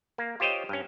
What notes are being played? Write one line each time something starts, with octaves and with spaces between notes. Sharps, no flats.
A#3
F4 G4 C5 C#5 D#5 G5
G2 C#4